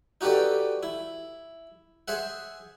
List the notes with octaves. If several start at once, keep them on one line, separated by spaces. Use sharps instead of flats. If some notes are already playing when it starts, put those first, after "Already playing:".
D#4 F#4 G4 A4 B4 D5
E4
G#4 C5 E5 F#5